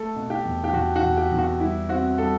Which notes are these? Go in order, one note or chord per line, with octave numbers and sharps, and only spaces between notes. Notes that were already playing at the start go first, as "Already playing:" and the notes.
Already playing: A3 A4
B2
G4
E2
G4
E2 F#4
F#4
E2
G4
E2
F#4
G3 E4
C4 F#4
G3 A4